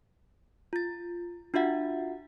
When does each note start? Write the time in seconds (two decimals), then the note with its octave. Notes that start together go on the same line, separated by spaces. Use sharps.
0.73 F4 A6
1.54 D4 F4 F#4 E5 F#5